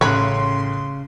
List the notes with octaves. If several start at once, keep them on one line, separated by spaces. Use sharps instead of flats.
A1 C#3 C#5 B5 C6 F#6